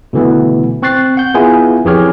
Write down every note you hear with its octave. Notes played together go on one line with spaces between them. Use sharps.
B2 D3 E3 A3 B3
C4 C#6 F#6 A6 C7
F#5 G6
B3 E4 F4 G#4 G#5
F2 E3 G4 G#4 C#5 F6